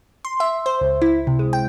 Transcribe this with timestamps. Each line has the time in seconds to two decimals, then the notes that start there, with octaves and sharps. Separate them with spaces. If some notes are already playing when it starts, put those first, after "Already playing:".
0.25 C6
0.40 E5
0.66 C5
0.81 C#2
1.02 E4
1.27 C3
1.39 G#3
1.53 G5